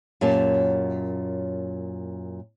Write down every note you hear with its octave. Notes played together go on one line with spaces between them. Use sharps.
F#2 A#2 C#4 G4 A5